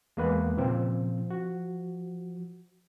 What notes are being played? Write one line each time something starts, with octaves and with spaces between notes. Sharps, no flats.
E2 G#3 A#3 B3 B4
A#2 C#3 F3 C4
F#4